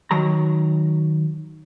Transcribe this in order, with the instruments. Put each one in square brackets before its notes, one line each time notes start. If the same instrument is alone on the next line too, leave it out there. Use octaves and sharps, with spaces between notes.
[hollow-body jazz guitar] D#3 F#3 A#5